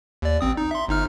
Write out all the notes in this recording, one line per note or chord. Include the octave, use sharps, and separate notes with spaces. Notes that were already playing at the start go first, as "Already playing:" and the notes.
D#2 D5
A1 C4 D#6
D#4
E5 C6
G1 D#4 F6